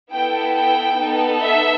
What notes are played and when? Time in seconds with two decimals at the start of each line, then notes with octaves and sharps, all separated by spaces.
0.12 B3 E4 A4 G5
0.55 G5
0.98 B3 D#4 A4
1.42 E5